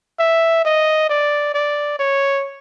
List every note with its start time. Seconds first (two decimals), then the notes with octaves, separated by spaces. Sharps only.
0.19 E5
0.65 D#5
1.10 D5
1.54 D5
1.99 C#5